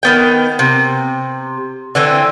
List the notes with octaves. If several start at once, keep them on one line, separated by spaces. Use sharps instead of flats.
D#3 B3 G5
C3
D3 E3 C4